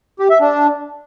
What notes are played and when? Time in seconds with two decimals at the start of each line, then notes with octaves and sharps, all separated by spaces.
0.20 G4
0.30 E5
0.40 D4